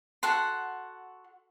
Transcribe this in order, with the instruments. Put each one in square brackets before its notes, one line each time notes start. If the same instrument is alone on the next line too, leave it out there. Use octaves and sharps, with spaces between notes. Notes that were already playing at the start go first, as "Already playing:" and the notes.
[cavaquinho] F#4 A4 F#5 C6